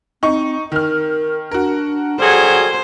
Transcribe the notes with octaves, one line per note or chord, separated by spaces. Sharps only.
C4 D#4 C#6
D#3 A#4 F6
D4 F#4 A#4
F#3 G3 G#4 A4 C5